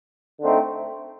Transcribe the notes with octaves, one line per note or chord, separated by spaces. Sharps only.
D3 A3 C4 D#4